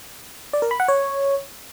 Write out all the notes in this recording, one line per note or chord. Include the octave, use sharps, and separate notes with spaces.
D5
A#4
B5
F#5
C#5